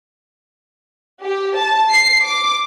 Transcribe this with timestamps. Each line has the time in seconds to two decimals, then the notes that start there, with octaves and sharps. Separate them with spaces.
1.24 G4
1.57 A5
1.91 C7
2.25 D6